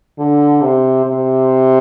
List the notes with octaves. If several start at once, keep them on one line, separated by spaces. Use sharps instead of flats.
D3
C3
C3